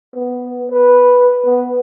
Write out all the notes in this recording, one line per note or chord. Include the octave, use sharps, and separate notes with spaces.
B3
B4
B3